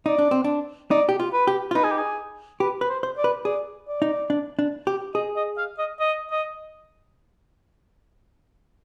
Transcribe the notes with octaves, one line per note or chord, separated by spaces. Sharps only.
D#4 D5
D4
C4
D4
D#4 D5
G4
F4
B4
G4
F4
D#4 B4
G#4
G4
G#4
G4 B4
B4
C5
C5
D5
B4
G#4 D5
D5
D#4
D4
D4
G4
G#4 D#5
D#5
F5
D#5
D#5
D#5